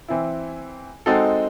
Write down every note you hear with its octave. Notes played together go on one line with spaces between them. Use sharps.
E3 C4 E4
G#3 C4 D#4 F#4 A4